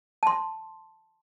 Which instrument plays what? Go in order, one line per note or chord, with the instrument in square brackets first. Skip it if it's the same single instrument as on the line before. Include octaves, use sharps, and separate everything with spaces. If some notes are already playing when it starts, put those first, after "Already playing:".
[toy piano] A5 C6